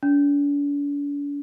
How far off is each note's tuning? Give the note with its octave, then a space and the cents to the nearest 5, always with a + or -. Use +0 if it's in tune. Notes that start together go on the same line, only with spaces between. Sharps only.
D4 -45